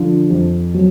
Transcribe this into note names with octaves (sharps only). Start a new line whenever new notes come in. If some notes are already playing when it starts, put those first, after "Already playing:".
Already playing: D3 F3
F2
F#3